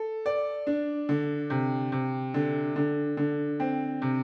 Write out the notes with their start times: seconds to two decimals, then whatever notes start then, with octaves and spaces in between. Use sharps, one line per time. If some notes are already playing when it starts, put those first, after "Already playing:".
Already playing: A4
0.26 D5
0.67 D4
1.09 D3
1.50 C3
1.92 C3
2.34 D3
2.76 D3
3.17 D3
3.60 C4
4.02 C3